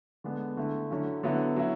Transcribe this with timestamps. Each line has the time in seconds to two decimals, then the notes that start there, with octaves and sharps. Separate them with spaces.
0.24 D3 G#3 B3 D4
0.57 D3 A3 E4
0.90 D3 F#3 C#4 E4
1.23 D3 F#3 B3 E4
1.56 F#3 C#4 E4